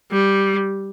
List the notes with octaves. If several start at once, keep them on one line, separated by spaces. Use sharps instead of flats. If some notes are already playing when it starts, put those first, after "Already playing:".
G3